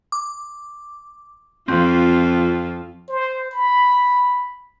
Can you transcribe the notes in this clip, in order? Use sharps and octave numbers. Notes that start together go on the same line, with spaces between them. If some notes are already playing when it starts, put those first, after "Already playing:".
D6
F2 C4 F4
C5
B5